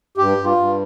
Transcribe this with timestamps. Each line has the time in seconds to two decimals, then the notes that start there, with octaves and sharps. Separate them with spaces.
0.18 G2 G4
0.38 G2
0.44 F4
0.57 G2